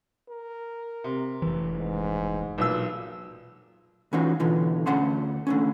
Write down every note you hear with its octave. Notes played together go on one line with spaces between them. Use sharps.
A#4
C3
F1 E3
G#2
B1 A#2 E6
E3 C#4 D#4 F4 F#4
B2 D3 E3 F4
D2 C#4 F#5 A5 C6
D3 A3 C#4